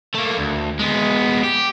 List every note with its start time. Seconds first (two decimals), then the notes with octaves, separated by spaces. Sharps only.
0.14 A3 A#3
0.37 D2
0.79 G#3 B3
1.44 G4